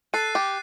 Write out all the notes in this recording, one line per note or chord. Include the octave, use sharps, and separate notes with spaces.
A4 F#6 A6 C7 D#7
G4